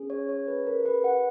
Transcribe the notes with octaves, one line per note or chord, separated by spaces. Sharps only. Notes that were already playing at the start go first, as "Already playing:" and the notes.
Already playing: C#4 G#4
C#5
C#5
B4
A#4
B4
F#5